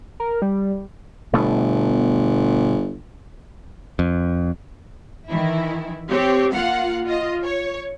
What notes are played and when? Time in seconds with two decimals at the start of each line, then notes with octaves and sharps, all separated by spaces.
0.20 A#4
0.42 G3
1.33 G1 B2 A3 B3
3.99 F2
5.28 D#3 E3 E4
6.09 C4 G4 C#5
6.53 A#3 F4 F5 F#5
7.04 F4 D#5
7.43 C#5